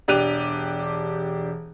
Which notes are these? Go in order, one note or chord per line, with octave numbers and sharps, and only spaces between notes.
E1 D4 G4 F#6 D#7 F7